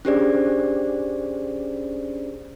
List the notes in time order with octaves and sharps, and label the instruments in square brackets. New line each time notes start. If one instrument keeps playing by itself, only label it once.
[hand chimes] C#4 D4 G4 G#4 C5 D5